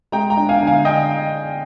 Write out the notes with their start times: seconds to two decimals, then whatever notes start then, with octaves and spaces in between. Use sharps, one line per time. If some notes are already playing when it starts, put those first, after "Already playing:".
0.12 G#3 G5 A#5
0.30 G5 A#5
0.37 D4
0.49 F5 G#5
0.61 D3
0.67 F5 G#5
0.85 D3 D#5 G5